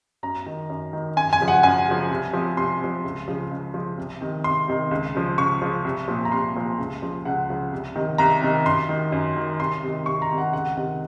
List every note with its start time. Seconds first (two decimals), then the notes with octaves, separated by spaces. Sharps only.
0.23 F#2 A#5
0.46 D#3
0.70 F#2
0.93 D#3
1.16 F#2 G#5
1.33 G#5
1.41 C#3 F3
1.48 F#5
1.63 F#2 G#5
1.87 C#3 F3
2.11 C2
2.33 C3 F3
2.57 C2 C6
2.81 C3 F3
3.04 C#2
3.28 C#3 F3
3.51 C#2
3.74 C#3 F3
3.98 C2
4.21 C3 D#3
4.44 C2 C6
4.68 C3 D#3
4.91 C#2
5.14 C#3 F3
5.38 C#2 C#6
5.62 C#3 F3
5.84 C2
6.08 A#2 F3
6.25 A#5
6.32 C2 C6
6.55 A#2 F3
6.78 C#2
7.02 C#3 F3
7.25 C#2 F#5
7.49 C#3 F3
7.73 C2
7.96 C3 D#3
8.18 C2 A#5
8.42 C3 D#3
8.66 F#2 C6
8.89 D#3
9.12 F#2
9.37 D#3
9.60 C2 C6
9.83 C3 D#3
10.06 C2 C#6
10.22 A#5
10.30 C3 D#3
10.38 F#5
10.53 C#2 F#5
10.77 C3 D#3